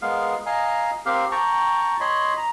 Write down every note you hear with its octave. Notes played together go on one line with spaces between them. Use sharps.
G#3 B3 A#4 F5
D#5 F5 G#5 A#5
C4 G4 A#4 F5
G5 A5 A#5 C#6
C#5 D#5 B5 C6
A#5